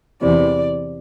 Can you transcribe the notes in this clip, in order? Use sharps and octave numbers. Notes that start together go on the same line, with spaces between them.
E2 C3 E3 D5